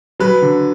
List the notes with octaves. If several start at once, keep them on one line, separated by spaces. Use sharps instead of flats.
F#3 B4
D3